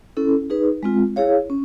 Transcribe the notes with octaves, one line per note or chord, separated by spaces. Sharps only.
C#4 E4 A4
D#4 G#4 B4
G#3 C4 F4
E4 G#4 C#5 F5
C#4